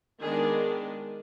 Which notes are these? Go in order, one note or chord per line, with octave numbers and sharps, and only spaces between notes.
D#3 G#3 B3 D4 G#4